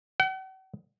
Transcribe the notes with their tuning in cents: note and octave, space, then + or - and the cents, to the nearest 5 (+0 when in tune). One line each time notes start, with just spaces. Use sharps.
F#5 +45